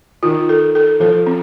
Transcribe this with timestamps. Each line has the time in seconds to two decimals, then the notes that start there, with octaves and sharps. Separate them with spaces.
0.23 D#3 F4
0.49 A4
0.75 A4
1.00 F3 A4
1.26 C4